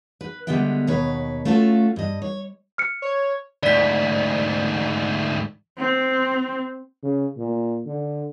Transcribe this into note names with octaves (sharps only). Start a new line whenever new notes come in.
B4
D3 G3 G#3 B3 E5 G5
D#2 B2 B4 C#5
A3 C#4 F4 F#4 A4
G2 D#5
C#5
F6 C#7
C#5
D2 G#2 D5 B6
C4
C#3
A#2
D3